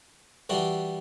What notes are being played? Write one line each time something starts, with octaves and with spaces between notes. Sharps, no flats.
E3 G3 D4 F#4